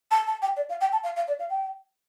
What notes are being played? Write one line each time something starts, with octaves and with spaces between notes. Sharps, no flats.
A5
A5
G5
D5
F5
G5
A5
F5
F5
D5
F5
G5